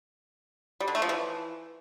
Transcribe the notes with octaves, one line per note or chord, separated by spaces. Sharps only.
G3
D3
A3
F3
E3